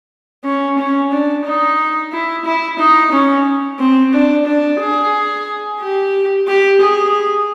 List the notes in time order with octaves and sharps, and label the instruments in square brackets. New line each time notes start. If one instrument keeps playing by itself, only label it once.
[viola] C#4
C#4
D4
D#4
E4
E4
D#4
C#4
C4
D4
D4
G#4
G4
G4
G#4